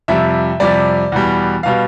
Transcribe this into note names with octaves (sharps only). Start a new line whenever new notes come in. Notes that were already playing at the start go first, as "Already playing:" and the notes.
F2 C3 G3 E5
F2 C3 G3 D5
E2 B2 G3
B2 G3 F5